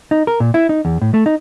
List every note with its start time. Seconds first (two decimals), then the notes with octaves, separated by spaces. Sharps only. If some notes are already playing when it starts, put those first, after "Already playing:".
0.11 D#4
0.27 A#4
0.40 A#2
0.54 E4
0.69 D#4
0.85 E2
1.01 A2
1.14 A3
1.26 D#4